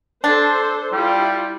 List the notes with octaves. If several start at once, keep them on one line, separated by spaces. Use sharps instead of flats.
D4 A4 C5
G3 E4 F4 G4